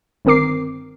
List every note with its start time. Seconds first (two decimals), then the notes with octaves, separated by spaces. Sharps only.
0.25 G1 D#3 C4 A#4 D6 C7